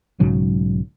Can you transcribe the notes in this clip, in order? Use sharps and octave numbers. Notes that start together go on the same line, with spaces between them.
B1 G#2 C#3 F#3